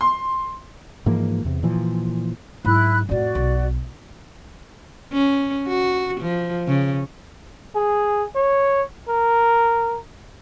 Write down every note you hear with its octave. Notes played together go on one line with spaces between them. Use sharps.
C6
G#2 E3 F3 A#3
E2 C3
A#2 E3 F3
G#2 F#3 E4 B5 F#6
F2 A2 F#4 D5
B1
C#4
F#4
F3
C#3
G#4
C#5
A#4